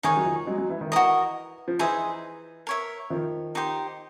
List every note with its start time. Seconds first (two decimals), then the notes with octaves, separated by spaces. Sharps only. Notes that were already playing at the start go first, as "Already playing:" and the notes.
0.03 D#3 D#4 G#4 C#5
0.16 F#3
0.25 D#3 F3
0.47 F#3 G#3
0.58 F#3 G#3
0.70 E3
0.81 D#3
0.92 E3 F#4 A#4 D#5
1.68 F3
1.79 E3 D#4 G#4 C5 E5
2.67 A#4 C#5 E5
3.10 D#3 F3
3.55 D#4 G4 C5